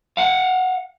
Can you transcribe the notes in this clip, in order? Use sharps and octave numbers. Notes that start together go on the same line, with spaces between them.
F5 F#5